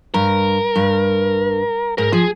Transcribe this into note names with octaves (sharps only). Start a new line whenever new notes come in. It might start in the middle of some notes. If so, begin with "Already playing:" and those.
G2 A#4
G2
G#2 A#4
F3 G#4